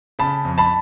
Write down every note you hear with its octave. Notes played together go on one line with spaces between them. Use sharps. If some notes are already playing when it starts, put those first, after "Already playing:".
C#3 A5 B5
F2
A5 B5